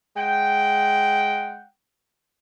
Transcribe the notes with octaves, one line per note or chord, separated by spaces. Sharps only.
G#3 F#5 G5